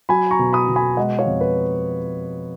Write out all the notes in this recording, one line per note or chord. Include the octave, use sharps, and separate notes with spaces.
F#3 G#5 B5
A#5 C#6
B2
B5 D#6
B2
G#5 B5
G#3 D#5 F#5
C#5 F5
F2
B4